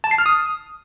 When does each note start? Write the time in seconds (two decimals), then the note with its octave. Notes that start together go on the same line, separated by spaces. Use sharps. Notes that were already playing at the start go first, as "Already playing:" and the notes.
0.04 A5
0.11 C7
0.18 F6
0.26 D#6